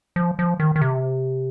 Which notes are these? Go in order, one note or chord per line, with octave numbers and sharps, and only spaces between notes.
F3
F3
D#3
D#3
C3